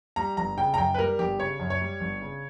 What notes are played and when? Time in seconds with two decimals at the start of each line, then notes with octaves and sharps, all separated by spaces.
0.16 G3 A#5
0.37 G1 A#5
0.58 C#3 G5
0.74 A#5
0.78 F#2 G5
0.94 B4
0.99 G3 A#4
1.19 G1 G4
1.39 C#3 C#5
1.60 F#2
1.70 C#5
1.81 G3
2.00 G1
2.21 C#3